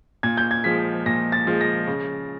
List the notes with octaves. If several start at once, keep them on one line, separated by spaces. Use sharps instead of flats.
A#2 G#6
G6
G#6
F3 G#3 B6
A#2 A#6
A6
F3 G#3
A#6
C#3